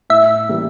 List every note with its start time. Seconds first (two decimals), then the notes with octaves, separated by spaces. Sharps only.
0.10 A2 E5
0.49 E3 G3 A#3